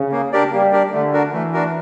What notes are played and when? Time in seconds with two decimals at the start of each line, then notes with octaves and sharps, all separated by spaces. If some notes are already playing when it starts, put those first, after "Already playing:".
Already playing: C#3
0.12 A#3
0.32 D4 G4 A#4 D5
0.52 G3 A#3
0.72 D4 G4 A#4 D5
0.92 D3 A3
1.13 D4 F#4 A#4
1.33 E3 A3
1.53 D4 F#4 A#4